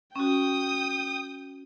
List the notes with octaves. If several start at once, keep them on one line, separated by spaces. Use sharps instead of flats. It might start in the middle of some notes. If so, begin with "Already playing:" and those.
C#4 F#4 G5 D#6